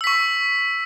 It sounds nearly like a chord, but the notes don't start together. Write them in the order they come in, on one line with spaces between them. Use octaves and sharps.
E6 B6 C#6